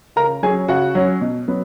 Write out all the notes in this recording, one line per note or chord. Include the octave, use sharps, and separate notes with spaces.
C#3 A#4 A#5
F#3 C#4 G#4 G#5
C#3 F#4 F#5
F#3 C#4
B2
F#3 B3